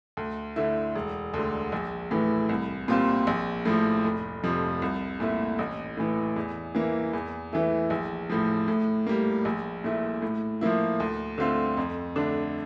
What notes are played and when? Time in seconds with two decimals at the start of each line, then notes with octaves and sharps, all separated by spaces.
0.17 D2
0.56 D3 A3 E4
0.95 E1
1.34 D2 D3
1.72 A#1
2.11 A2 E3
2.49 C2
2.88 A#2 G3 C4 F4
3.27 A#1
3.65 A2 F3
4.04 F1
4.43 F2 C3 F3
4.82 C2
5.20 A#2 A3 E4
5.59 A1
5.97 A2 E3
6.36 E2
6.75 E3 A#3 E4
7.13 E2
7.52 E3 A3 E4
7.90 A#1
8.30 A2 F3
8.68 A2
9.07 G3 A#3
9.45 A#1
9.84 A#2 A3 E4
10.22 A2
10.61 F3 A#3 E4
11.00 D2
11.38 D3 A3 C4 F4
11.77 F2
12.16 D3 A3 D4